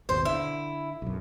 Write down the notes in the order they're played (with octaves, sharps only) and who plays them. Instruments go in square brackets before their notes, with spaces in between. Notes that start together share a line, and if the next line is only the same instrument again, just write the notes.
[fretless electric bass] G#1 D#2 B2 [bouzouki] C5
[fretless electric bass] D3 [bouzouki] E4
[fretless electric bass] B1 F#2